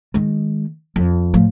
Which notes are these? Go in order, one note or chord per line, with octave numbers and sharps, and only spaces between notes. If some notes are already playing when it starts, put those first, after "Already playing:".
D#3 G#3
F2
A2 F3